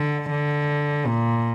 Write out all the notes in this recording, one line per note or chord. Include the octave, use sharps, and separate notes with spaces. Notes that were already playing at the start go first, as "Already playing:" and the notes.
Already playing: D3
D3
A#2